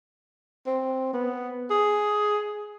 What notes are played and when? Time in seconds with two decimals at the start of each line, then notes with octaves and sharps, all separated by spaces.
0.67 C4
1.13 B3
1.70 G#4